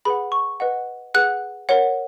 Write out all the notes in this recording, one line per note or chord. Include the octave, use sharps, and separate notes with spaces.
G#4 B4 F#5 B5
C#6
B4 D#5 F#5
G#4 B4 F#5 F#6
A#4 C#5 F#5